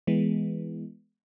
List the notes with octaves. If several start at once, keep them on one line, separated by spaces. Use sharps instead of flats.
E3 G#3 B3